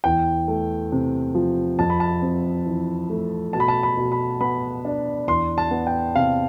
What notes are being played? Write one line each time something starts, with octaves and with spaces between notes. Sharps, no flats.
E2 G5
A3
C3
F3
F2 A5
B5
A5
C4
E3
A3
B2 A5
B5
A5
B5
B2
B5
B3 B5
D4
E2 C6
A5
B3
G5
C3 F5